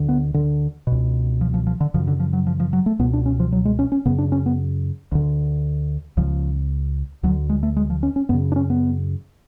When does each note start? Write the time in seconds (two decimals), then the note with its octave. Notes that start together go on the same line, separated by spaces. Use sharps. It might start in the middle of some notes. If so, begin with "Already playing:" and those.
Already playing: D2 D3
0.09 B3
0.34 D3
0.87 C#2 B2
1.41 F3
1.54 F3
1.67 F3
1.80 D3
1.94 F#2 C#3 F3
2.07 D3
2.20 F3
2.33 F#3
2.47 F3
2.60 F3
2.73 F#3
2.86 A3
2.99 C#2 B2 B3
3.13 D4
3.26 C#4
3.40 F3
3.52 F#3
3.65 G#3
3.79 C#4
3.92 C#4
4.06 F#2 C#3 B3
4.18 D4
4.32 C#4
4.46 B3
5.12 D2 D3
6.17 C#2 C#3 F3
7.23 D2 D3 F#3
7.49 G#3
7.63 A3
7.77 G#3
7.90 F3
8.03 C#4
8.16 C#4
8.29 F#2 C#3 B3
8.52 D4
8.56 C#4
8.70 B3